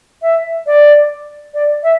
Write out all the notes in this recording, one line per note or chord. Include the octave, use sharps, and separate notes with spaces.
E5
D5
D5
E5